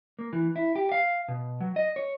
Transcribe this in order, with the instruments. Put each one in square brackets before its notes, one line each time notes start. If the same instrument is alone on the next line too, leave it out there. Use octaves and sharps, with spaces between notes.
[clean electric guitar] A#3
E3
E4
G4
F5
B2
F#3
D#5
C#5